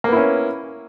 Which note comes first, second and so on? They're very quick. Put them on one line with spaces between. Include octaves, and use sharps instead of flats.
A#3 B3 E4 C#4